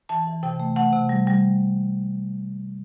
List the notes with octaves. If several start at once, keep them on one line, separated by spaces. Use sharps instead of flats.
E3 A5
E3
C3 G5
A3
A3 F#5
C3
G3
G3